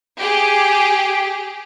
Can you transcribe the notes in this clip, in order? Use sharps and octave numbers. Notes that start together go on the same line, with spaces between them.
G4 G#4